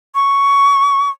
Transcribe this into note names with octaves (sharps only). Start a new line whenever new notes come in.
C#6